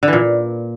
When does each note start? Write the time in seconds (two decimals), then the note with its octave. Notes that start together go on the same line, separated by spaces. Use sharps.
0.03 D3
0.08 E3
0.13 A#2